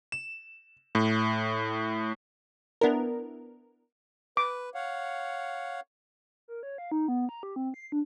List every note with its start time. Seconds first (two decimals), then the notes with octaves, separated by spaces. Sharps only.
0.12 E7
0.95 A2
2.81 B3 D4 E4 A#4
4.37 B4 D6
4.75 C#5 F5 F#5
6.48 A#4
6.63 C#5
6.78 F5
6.92 D#4
7.08 B3
7.29 A#5
7.43 G4
7.56 C4
7.74 C7
7.92 D4